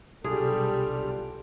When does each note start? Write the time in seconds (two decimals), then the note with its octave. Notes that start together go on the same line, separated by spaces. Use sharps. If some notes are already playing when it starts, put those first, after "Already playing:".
0.24 B1 C3 G3 D4 F4 G#4 A4